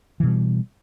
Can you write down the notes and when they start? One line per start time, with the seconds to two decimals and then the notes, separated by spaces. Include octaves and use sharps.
0.20 E3
0.23 B2
0.26 G3